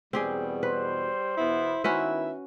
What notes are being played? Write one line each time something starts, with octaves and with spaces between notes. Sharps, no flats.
E2 B2 G3 C4 G4 G#4
B4 C5
E2 B2 B3 E4
D#3 B3 C#4 E4 F#4 B4 E5